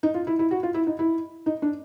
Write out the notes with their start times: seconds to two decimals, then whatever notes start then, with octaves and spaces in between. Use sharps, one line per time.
0.03 D#4
0.14 F4
0.27 E4
0.39 E4
0.51 F#4
0.63 F4
0.74 E4
0.87 D#4
0.99 E4
1.46 D#4
1.62 D4